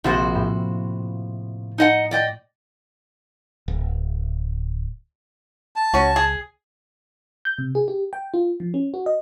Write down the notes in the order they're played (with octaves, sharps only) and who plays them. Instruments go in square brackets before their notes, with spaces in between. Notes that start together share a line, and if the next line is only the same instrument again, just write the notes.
[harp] A#1 [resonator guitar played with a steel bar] C3 F#4 C5
[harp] A2
[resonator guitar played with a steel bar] D#4 D#5 F#5
D5 D#5 G5
[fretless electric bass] D1
[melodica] A5
[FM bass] C#2 [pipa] C#4 F#4
[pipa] G#4
[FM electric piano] G6
C3
G#4
G4
G5
F4
F3
C#4
F#4
D#5